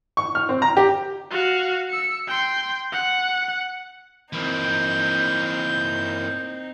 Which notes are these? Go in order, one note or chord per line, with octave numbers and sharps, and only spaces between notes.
C#6
F6
C4
A#5
G4
F#4 F5
E6 C#7
G5 C6
F#5
E3 A#3 C4 D#4 G6